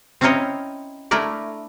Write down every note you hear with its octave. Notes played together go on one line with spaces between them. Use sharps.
C4 C#4 E4 A#4 C#5 D#5
A3 D4 E4 A#4 D5